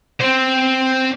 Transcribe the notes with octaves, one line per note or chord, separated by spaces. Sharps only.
C4 C5